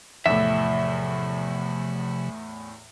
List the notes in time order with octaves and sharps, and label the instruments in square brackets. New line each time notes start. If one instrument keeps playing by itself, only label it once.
[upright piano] E2 A2 [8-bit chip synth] C3 F3 [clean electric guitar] E5